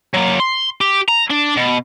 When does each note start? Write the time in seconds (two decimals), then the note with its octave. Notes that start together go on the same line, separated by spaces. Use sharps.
0.14 F#3 A#3
0.40 C6
0.81 G4
1.08 A#5
1.30 D4
1.57 B2